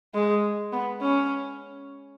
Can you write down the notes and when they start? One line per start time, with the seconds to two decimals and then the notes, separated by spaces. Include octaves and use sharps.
0.14 G#3
0.73 B3
1.02 C#4